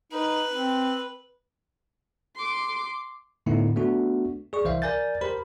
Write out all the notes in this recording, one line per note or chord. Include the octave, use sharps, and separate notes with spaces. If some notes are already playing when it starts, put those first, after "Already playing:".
D#4 B4
C4
C6 D6
A2 D3 A3 B3 D#4 E4
A3 B3 D4 F#4
G#4 D5 C#6
C2 E3 C5 E5 F5
A#4 D5 G#5 G6 A6
G4 A#4 C5 B5